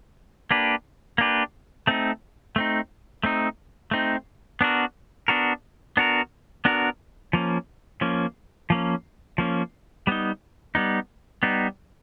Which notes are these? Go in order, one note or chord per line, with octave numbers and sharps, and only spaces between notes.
A#3 D4 G4 B4
A#3 D4 G4 B4
A3 C4 D#4
A3 C4 D#4
A3 C4 D#4
A3 C4 D#4
B3 D4 F#4 A#4
B3 D4 F#4 A#4
B3 D4 F#4 A#4
B3 D4 F#4 A#4
F3 A#3 C#4
F3 A#3 C#4
F3 A#3 C#4
F3 A#3 C#4
G3 B3 D#4
G3 B3 D#4
G3 B3 D#4